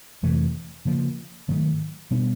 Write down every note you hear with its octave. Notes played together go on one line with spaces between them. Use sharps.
F2 C3 E3 A3
C#3 F3 A#3
G#2 D#3 F#3 A3
B2 G3 B3 D4